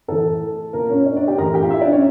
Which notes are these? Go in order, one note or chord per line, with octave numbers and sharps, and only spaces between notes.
A2 E3 A3 A4
A#2 A#3 A#4
C#4 C#5
D4 D5
D4 D5
G4 G5
A2 E3 A#4 A#5
G4 G5
F4 F5
E4 E5
D4 D5
C#4 C#5